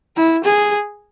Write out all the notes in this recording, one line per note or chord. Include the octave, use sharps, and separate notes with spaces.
E4
G#4